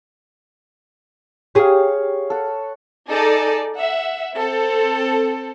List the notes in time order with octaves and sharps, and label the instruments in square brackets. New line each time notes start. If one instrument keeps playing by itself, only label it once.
[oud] G4 G#4 [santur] C#5 F5
[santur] A4 F#5
[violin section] D#4 G#4 A4 D5
E5 F#5
C4 A4